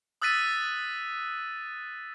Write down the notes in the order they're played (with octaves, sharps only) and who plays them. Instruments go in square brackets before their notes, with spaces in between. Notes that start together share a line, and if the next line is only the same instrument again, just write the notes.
[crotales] D#6 E6 F#6 A6 B6 D#7